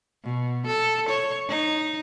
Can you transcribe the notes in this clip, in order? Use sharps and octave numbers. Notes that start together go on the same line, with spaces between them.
B2
A4
C#5
D#4